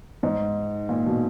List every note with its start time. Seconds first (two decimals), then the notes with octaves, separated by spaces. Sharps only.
0.23 G#2
0.89 A#2
1.06 B2